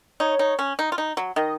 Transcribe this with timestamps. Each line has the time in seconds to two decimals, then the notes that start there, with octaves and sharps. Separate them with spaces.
0.20 D#4 C#5
0.39 D#4
0.59 C#4
0.79 D#4
0.92 F4
0.98 D#4
1.17 F#3
1.36 D#3 D#5